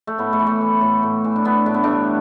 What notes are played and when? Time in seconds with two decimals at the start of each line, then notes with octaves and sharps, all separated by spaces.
0.07 A3
0.18 A2 B3
0.33 A3
0.39 E3
0.47 A3
0.61 E3
0.81 A2
1.03 A2
1.24 E3
1.36 D4
1.44 E3 B3
1.66 A2 D4
1.74 B3
1.83 G2 A3 D4